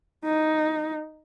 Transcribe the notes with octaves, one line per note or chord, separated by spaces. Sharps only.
D#4